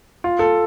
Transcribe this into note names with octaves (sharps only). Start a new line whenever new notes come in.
F4
A4